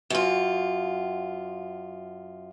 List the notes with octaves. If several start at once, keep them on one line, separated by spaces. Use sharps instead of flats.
F#2 F4